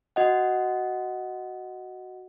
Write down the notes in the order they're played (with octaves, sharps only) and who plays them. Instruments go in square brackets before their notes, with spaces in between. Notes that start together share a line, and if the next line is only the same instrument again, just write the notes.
[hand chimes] F#4 D#5 F#5